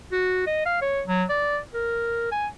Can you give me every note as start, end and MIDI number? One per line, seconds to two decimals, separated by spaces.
0.12 0.46 66
0.47 0.61 75
0.66 0.82 77
0.82 1.02 73
1.08 1.24 54
1.29 1.59 74
1.74 2.27 70
2.32 2.47 80